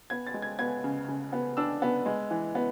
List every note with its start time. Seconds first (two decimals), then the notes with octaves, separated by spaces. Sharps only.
0.10 B3 G#6
0.27 A6
0.34 G#3
0.42 G#6
0.59 B3 G#6
0.84 C#3
1.08 C#3
1.33 B3
1.57 D4 E6
1.82 B3
2.06 G#3
2.31 E3
2.55 B3